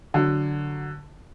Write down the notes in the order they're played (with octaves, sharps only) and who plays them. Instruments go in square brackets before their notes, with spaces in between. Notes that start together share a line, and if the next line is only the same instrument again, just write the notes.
[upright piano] D3 F#3